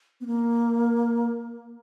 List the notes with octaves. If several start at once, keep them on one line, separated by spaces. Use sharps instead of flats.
B3
A#3